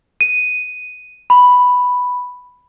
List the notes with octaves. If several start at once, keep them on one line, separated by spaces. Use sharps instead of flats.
D#7
B5